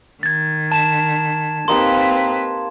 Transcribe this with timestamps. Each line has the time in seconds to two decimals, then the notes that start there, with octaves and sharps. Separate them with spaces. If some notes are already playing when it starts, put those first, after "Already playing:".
0.23 D#3 G#6 A6
0.72 A5 E7
1.68 A#3 C4 D#4 G4 B4 C6